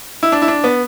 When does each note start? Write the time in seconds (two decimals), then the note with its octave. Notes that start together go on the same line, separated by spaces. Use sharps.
0.23 E4
0.32 D4
0.42 E4
0.48 D4
0.64 B3